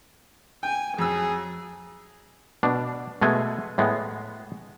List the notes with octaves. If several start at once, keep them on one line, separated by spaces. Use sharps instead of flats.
G5 G#5
F2 F#3 G#4 E6
B2 D4
B2 G#3 A3 G#5
A2 G#3 B3